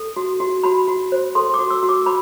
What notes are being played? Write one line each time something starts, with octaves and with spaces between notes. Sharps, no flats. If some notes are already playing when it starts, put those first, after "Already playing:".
Already playing: A4
F#4
F#4
F#4 B5
F#4
C5
A4 C6
D6
F#4
E6
F#4
D6
F#4 B5